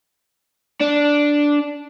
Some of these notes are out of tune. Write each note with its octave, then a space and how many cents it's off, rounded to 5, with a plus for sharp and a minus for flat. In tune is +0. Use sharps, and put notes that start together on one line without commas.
D4 -5